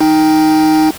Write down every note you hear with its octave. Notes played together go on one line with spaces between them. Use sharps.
D#4 G5